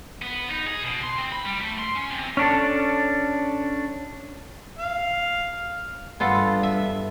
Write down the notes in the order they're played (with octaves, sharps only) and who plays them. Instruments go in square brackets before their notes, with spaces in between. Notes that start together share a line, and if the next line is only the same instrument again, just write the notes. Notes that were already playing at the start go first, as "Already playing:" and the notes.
[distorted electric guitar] B3
D#4
G#4
B2
C6
C4
B5
G3
A3
C6
C#4
C3
[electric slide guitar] C#4 D4 A4
[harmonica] F5
[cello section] G2 [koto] B3 F4 A4
[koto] E5